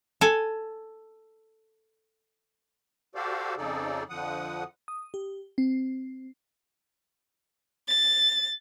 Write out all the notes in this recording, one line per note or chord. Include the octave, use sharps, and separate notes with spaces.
A4 G#5
F#4 G4 A4 C5 D5 F5
F2 C#3 D#4 G#4 A4 D5
F2 D3 F3 F#5 D#6
D#6
G4
C4
A6